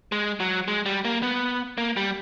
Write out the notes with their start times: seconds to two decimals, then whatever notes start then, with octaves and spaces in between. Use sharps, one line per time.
0.12 G#3
0.40 F#3
0.68 G#3
0.86 G3
1.05 A#3
1.22 B3
1.78 A#3
1.97 G3